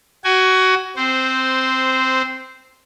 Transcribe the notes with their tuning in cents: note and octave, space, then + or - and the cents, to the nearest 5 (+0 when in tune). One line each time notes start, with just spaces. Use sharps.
F#4 +20 G#5 +0
C4 +0 C5 -10